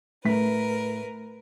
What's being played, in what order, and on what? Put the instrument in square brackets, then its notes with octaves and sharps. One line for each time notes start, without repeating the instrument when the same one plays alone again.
[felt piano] A2 A3 B6 [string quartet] A#4 B4